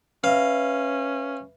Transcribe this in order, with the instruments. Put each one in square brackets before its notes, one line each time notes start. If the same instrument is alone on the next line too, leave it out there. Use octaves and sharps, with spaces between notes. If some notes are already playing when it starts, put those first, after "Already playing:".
[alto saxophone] C#4 [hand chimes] B4 E5 [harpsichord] F5